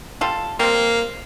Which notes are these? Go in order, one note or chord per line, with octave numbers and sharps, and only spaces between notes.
G3 F4 A4
G3 A#3 C4